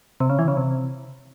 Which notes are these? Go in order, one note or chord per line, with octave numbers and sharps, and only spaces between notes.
C3
C#3
E3
C#3
C3